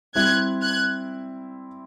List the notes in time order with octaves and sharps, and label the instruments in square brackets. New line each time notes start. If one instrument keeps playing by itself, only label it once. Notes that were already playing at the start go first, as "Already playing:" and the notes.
[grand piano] G3 C4 E4 [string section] F#6 G#6
[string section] F#6 G#6